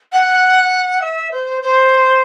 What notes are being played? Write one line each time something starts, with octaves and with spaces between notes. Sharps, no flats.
F#5
E5
C5
C5